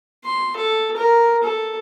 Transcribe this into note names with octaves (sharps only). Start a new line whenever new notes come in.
C6
A4
A#4
A4